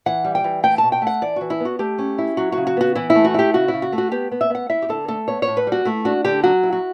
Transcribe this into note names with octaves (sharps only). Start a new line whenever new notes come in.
E3 F#5
G3
G5
E3
A3 G5
A5
B2
G5
A3 F#5
E3 D5
E3 F#4
E4
B3
F#4
A3 G4
C#4
E4
F#3 F#4
C#3 F#4
F#4
B3 F#4
E3 E4
E4
A3
F#4
E4 G4
C#3 F#4
E4
C#3
F#4
A3
F#4
B3 G4
B3
E5
B3 F#5
E4 E5
G4
D3 A4
A3 A4
B3 C#5
C#5
A2
B4
G3 F#4
A3 E4
D4 F#4
D3 G4
F#3 F#4
E4
F#4